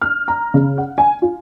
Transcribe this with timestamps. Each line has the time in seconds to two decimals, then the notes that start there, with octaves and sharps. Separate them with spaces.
0.01 F6
0.28 A#5
0.54 C#3
0.78 F#5
0.98 G#5
1.22 F4